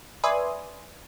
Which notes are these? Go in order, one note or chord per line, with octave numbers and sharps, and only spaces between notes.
B4 D5 E5 G#5 C6 D#6